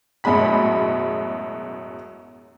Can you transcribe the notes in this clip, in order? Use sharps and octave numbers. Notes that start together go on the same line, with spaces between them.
A1 F#2 B2 G#3 B5 B6